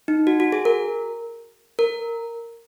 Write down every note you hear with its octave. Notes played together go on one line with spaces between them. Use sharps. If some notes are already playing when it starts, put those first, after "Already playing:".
D#4
F#4
F#4
G#4
A#4
A#4